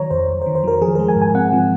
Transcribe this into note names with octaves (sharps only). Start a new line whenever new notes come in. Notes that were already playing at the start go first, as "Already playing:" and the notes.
Already playing: D#3 F#3 C#5 A#5
F2 C5
F2
C5
D#3
C5
F#3 A#4
F3 G#4
G#3 A#4
G#5
G#2
G#5
C4 F#5
F3